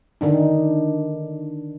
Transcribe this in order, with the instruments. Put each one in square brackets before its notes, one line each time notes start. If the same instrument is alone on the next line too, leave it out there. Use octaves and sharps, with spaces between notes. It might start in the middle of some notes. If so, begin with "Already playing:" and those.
[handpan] D3 D#3 D4 D#4